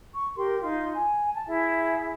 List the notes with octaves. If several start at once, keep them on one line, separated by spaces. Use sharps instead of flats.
C#6
G4 A#4 C6
D#4 F4 C6
G#5
A5
E4 G#4 E5